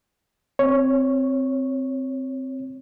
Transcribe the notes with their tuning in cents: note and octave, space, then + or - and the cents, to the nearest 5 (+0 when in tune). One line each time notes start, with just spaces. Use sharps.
C4 +0 C#5 +0